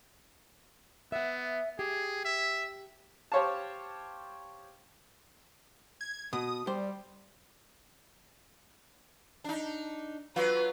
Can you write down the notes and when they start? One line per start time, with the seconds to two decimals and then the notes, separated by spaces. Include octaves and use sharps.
1.12 B3 E5 F#5
1.79 G4 G#4
2.25 E5
3.32 G4 C5 C#5 F5 A5
6.01 G#6
6.33 B2 D#6
6.67 G3 C5
9.44 D4 D#4
10.36 F#3 F4 B4